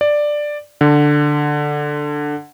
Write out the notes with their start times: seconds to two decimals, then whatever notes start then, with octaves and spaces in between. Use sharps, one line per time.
0.01 D5
0.81 D3